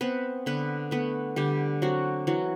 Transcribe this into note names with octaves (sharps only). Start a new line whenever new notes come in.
B3 C4 B4
D3 B3 B4
A3 B3 B4
D3 G3 G4
F#3 C4 F#4
E3 F#3 F#4